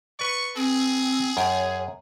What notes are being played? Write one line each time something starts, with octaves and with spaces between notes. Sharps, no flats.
B4 D5 C#6
C4 G#4
F#2 C#5 G5